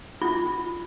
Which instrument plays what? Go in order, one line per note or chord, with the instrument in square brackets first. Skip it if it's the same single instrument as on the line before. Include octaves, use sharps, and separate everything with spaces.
[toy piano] F4